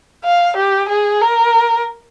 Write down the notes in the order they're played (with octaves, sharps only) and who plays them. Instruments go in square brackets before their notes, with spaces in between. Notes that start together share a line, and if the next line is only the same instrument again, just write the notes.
[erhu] F5
G4
G#4
A#4